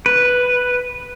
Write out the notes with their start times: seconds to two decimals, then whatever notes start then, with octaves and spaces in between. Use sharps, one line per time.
0.06 B4